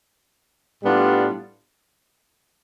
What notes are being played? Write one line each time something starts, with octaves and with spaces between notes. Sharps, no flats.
A2 G3 B3 D4 F4